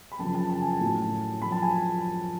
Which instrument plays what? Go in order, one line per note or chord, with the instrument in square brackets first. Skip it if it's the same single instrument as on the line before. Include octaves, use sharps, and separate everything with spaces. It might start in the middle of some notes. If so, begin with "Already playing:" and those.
[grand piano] B5
F#2 C#3 F3 A5
A5
A5
G#5
A5
A2 F#3
F#2 F3 B5
A5
G#5